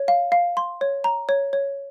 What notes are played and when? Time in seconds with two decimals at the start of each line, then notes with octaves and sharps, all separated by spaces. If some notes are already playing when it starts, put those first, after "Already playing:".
Already playing: C#5
0.08 F5
0.32 F5
0.57 C6
0.81 C#5
1.04 A#5
1.29 C#5
1.53 C#5